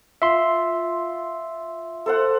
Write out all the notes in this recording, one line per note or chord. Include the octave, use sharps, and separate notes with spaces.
F4 E5 C6
A4 C5 F#5